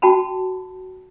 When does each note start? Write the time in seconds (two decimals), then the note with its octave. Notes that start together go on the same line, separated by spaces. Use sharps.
0.02 F#4 G5 A5 B5